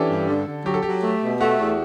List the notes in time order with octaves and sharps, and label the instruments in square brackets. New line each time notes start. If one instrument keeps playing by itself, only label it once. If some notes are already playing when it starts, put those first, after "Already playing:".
Already playing: [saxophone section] E3 [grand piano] C#4 D4 G4 A4
[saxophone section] G2
D3
D3
[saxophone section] F#3 [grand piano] G4
[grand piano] A4
[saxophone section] F#3 [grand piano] G4
[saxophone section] A3
B2
[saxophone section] A3 [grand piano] F#4
[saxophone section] E2